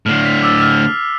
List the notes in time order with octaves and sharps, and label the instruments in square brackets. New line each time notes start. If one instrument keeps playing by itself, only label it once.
[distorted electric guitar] A2 D3 [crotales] F6 C7
[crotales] B6 F7
D6 E6 A6
E6 F6